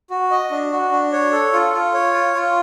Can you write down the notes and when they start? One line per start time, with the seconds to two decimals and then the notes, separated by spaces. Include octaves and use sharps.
0.10 F#4
0.31 D#5
0.51 D4
0.72 F#4
0.91 D4
1.12 C#5
1.32 A4
1.53 F4
1.73 F4
1.94 C#5
2.14 F4
2.34 F4